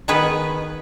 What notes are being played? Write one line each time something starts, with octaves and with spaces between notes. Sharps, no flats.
D#3 B3 G#4 B4